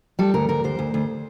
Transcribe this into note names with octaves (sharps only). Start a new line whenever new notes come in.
G3 A4
D2 A#4
D2 A#4
D2 C5
D2
D2